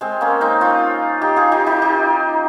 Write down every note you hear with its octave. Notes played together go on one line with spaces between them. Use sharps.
G#3 C4
A#3 C#4
C4 D#4
C#4 F4
D#4 G4
F4 G#4
D#4 G4
D#4 G4
D#4 G4